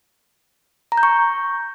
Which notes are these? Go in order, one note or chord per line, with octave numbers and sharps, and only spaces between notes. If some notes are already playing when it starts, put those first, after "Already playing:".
A#5
G6
C#6